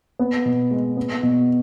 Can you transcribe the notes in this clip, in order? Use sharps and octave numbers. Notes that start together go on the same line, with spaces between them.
B3
B2
G#3
B3
B2